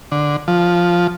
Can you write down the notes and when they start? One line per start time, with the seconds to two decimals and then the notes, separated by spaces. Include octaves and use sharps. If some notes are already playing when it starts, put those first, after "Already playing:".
0.12 D3
0.48 F3